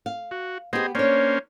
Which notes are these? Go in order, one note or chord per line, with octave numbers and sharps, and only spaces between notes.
F5
F#4
B3 G4 G#4 C5 D#5
A#3 C#4 D4 C5 C#5